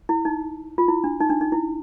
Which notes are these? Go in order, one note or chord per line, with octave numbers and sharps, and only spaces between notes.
E4
D#4
F4
E4
D4
D#4
D4
D#4
E4